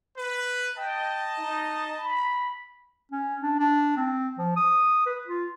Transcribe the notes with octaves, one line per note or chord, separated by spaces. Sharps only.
B4
D#5 G5 A5
D#4
B5
C#4
D4
D4
C4
F3
D#6
B4
F4